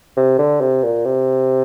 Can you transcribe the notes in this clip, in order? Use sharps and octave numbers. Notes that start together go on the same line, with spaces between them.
C3
D3
C3
A#2
C3